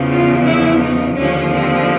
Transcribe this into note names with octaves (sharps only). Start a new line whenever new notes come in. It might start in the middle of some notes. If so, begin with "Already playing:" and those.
Already playing: E2 C#3 F3
F4
E4
D#4
D#2 D3 F3 C#4
C4